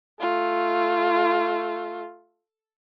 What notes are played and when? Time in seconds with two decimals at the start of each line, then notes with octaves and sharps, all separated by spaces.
0.20 A3 F4